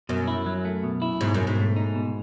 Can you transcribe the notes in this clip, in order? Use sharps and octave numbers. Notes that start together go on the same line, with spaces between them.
F#2 B2
E4
F#3
A3
B2
E4
G#2 B2
F#2 B2
G#2
A3
D#4
B2